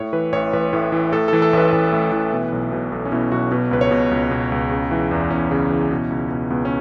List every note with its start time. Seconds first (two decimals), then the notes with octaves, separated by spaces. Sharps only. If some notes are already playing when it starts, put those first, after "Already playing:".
Already playing: A2 C#5
0.13 E3 B4
0.33 A1 C#5
0.53 A1 B4
0.73 A2
0.92 E3
1.12 A2 A4
1.28 E3 A4
1.42 A4
1.53 A1 B4
1.72 A1
1.92 A2
2.12 E3
2.33 B2
2.52 B1
2.72 B2
2.92 B1 A4
3.05 C#4
3.12 B2 E4
3.32 B1 F#4
3.51 B2 B4
3.71 C#2 B4
3.81 C#5
3.91 B2
4.11 C#2
4.31 B2
4.52 C#2
4.72 C#3
4.91 E3
5.11 E2
5.31 E2 C#4
5.51 C#3
5.70 E3
5.91 B2
6.10 C#2
6.31 B2
6.50 C#2 B3
6.65 C#4